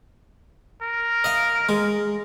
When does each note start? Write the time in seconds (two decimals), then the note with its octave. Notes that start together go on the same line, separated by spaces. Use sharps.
0.82 A#4
1.24 D#5 F5
1.69 G#3